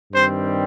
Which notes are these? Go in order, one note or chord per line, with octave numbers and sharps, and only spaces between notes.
G2 D#3 G3 C4 C5